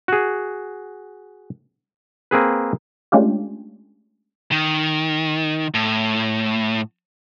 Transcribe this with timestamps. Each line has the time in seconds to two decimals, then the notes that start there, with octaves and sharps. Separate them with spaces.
0.08 F#4 G#4
2.31 A#3 C4 G#4 B4
3.12 G#3 A3 C#4 D4 F4 G4
4.52 D#3
5.74 A2